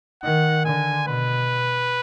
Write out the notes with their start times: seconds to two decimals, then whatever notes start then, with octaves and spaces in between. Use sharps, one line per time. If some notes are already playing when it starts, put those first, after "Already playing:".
0.23 D#3 F#5
0.64 D3 G#5
1.07 B2 B4